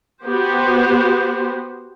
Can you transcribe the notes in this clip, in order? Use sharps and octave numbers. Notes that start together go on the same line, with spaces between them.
B3 F#4 G4 C5